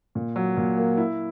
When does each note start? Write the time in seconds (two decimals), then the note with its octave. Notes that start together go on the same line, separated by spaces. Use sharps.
0.15 A#2
0.36 F#3
0.57 A#2
0.77 A#3
0.97 E4